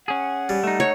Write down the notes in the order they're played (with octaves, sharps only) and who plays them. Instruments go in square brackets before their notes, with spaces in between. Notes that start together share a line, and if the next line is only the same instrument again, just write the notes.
[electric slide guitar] C#4 G#4 [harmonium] F#5
[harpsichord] G3
[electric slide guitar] A3 D#4
[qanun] C#5